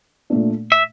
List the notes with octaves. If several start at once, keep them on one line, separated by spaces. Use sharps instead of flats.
A#2 A3 D4
E5